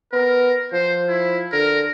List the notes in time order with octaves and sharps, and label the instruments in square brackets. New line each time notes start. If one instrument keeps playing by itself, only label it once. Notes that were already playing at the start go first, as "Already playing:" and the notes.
[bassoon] B3 [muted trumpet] A#4
[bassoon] F3 [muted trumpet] C5
[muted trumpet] E4
[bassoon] D3 [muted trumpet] A#4